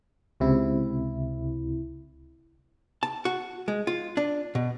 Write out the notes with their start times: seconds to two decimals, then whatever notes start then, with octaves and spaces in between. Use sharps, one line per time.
0.40 C#2 C3 E4
3.03 A5
3.25 F#4
3.68 G#3
3.87 F4
4.17 D4
4.55 B2